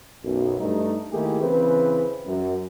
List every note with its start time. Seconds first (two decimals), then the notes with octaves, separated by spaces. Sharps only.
0.24 B1 F#2
0.59 G2 A3 D#4
1.12 D#3 A3 A#3 E4 G4 G#4
1.41 C#3 E3 C4 B4
2.27 F#2